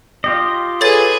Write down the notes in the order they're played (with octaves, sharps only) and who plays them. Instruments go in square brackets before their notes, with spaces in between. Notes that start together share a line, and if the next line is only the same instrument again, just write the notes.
[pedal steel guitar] F4 G4 D#5
[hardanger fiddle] G#4 B4 [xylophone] A4 C#5 A6